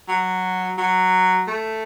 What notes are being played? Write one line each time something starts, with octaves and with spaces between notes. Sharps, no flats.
F#3
F#3
A3